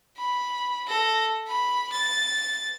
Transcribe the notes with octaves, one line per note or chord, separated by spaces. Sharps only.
B5
A4 A#6
B5
A6